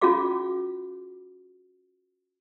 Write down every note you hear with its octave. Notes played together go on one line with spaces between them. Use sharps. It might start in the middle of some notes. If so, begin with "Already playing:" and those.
C#4 F4 F#4 G#4 F5 D6